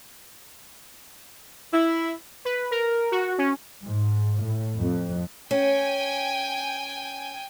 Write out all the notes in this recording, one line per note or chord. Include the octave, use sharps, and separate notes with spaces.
E4
B4
A#4
F#4
C#4
G#2
A2
F2
C#4 G5 G#5